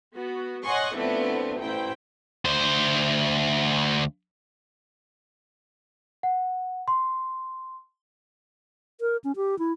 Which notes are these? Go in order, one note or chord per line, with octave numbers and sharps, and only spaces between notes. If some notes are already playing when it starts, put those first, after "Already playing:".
B3 F#4
C#5 D#5 F#5 G#5 C6 C#6
F3 A3 B3 C4 D4 E4
A1 E4 C5 G5
D2 C5
F#5
C6
A#4
C#4
G4
E4